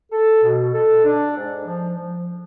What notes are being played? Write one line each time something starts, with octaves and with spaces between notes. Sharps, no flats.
A4
B2
A4
D4
G#2
F3
F3